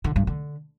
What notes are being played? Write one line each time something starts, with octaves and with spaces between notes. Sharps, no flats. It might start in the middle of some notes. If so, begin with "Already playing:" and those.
D3
G2
D3